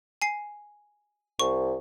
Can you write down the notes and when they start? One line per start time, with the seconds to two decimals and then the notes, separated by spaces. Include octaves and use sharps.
0.22 G#5 C7
1.39 C2 C#6